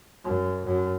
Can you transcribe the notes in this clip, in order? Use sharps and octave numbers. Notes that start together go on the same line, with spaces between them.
F#2
F#2